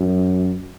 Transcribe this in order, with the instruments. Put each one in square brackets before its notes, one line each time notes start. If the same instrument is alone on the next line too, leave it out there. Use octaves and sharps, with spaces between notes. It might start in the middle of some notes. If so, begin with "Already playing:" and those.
Already playing: [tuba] F#2